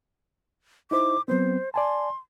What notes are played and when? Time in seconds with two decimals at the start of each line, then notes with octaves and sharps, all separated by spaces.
0.91 D#4 E4 C5 D6
1.28 F#3 B3 C4 C5
1.74 D5 G#5 A5 C6